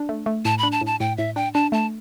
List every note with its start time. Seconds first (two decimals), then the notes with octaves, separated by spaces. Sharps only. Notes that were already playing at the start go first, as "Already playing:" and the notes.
Already playing: D4
0.09 A3
0.26 A3
0.45 A2 A5
0.58 B5
0.63 D4
0.72 A5
0.81 A2
0.86 A5
1.00 A2 G5
1.18 A2 E5
1.36 D4 G5
1.54 D4 A5
1.72 A3 A5